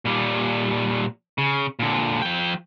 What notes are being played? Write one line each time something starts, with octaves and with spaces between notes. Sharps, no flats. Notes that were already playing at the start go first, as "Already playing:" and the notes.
A#2 G3
C#3
A#2 D3
F3 G5